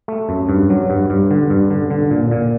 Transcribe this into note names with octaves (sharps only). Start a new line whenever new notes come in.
A3
F#2
G2
F#3
G2
G2
D3
G2
D3
D3
A#2
A#2